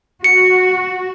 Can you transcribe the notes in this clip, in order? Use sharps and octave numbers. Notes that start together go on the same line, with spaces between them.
F#4 C#7